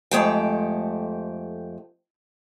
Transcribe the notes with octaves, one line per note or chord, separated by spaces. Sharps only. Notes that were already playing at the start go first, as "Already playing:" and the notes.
F2 G#3 A3 G4 C5 G5